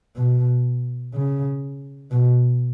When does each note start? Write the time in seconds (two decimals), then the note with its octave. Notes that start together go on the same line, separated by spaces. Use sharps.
0.16 B2
1.14 C#3
2.11 B2